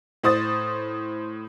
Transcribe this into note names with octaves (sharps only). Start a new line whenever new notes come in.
A2 C5 D#6 A6